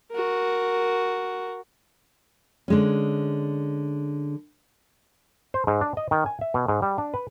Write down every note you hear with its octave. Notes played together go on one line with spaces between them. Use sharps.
F#4 A#4
D3 G#3 C#4
C5
G#2
D4
D#5
D#3
G#5
E5
B2
G#2
G3
D4
B4